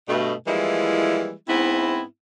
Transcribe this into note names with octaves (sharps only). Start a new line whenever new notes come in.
G2 B2 A3
E3 F3 G3 G#3 A#3 E4
G#2 B3 C4 E4